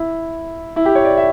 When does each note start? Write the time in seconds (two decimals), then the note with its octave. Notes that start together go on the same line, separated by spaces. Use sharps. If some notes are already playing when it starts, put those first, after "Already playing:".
Already playing: E4
0.76 E4
0.85 G4
0.95 C#5
1.05 D5
1.17 E5